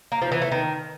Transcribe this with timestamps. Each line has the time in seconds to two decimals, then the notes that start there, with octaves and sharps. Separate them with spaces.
0.12 A#3
0.22 F3
0.32 E3
0.42 A3
0.52 D#3